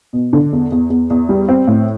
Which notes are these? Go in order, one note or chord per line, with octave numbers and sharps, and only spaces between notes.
B2
D3
E2
E2
E2
E2
G3
C4
A2